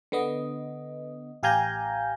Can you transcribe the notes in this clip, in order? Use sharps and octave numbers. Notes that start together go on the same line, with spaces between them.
D3 B3 D#5
A1 G4 F5 G#5 A#5 G6